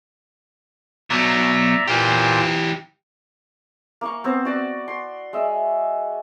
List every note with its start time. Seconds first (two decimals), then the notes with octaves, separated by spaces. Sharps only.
1.10 B2 F#3 D5 E5 A#5
1.88 A#2 E3 F4 G4 C5
4.01 A#3 F5 C#6
4.24 B3 C4 C5
4.45 F#4 D5 C#6
4.88 C6
5.33 G#3 E5